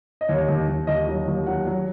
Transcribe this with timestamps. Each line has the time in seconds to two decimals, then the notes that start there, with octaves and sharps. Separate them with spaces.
0.21 D#5
0.29 D#2 C#5
0.49 D#2
0.68 D#2
0.87 D#2 D#5
1.07 F#3
1.28 D#2
1.47 F#3 F#5
1.67 F#3